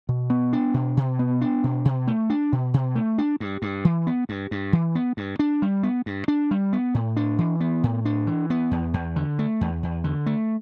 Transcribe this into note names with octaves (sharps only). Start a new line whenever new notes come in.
B2
B3
D4
B2
B2
B3
D4
B2
B2
A3
D4
B2
B2
A3
D4
G2
G2
E3
B3
G2
G2
E3
B3
G2
D4
G3
B3
G2
D4
G3
B3
A2
D4
E3
B3
A2
D4
E3
B3
E2
E2
D3
A3
E2
E2
D3
A3